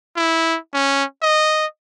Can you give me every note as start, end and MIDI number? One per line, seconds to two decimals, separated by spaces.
0.16 0.58 64
0.73 1.04 61
1.22 1.66 75